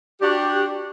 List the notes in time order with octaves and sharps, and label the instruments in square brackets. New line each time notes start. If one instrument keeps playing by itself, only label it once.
[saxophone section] D4 F#4 G4